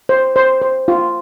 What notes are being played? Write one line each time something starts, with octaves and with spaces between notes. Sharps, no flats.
C5
C5
C5
F4